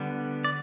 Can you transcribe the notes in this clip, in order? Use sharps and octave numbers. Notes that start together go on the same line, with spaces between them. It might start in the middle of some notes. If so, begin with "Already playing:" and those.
Already playing: D3 G3 B3
D5